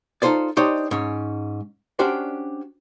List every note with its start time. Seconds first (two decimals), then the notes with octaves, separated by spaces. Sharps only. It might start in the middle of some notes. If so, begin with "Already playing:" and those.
0.22 D#4 F4 A4 C5 D5
0.57 D4 D#4 G4 C5 C#5 D#5
0.91 G#2 C#4
1.99 C#4 D4 F#4 G4 C5 D5